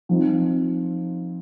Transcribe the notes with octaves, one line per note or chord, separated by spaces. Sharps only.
F3 C4 D#4